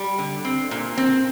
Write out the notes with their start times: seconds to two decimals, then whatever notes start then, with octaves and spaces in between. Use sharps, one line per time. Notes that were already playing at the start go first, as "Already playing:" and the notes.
Already playing: G3
0.18 D3
0.45 C4
0.71 A#2
0.98 C4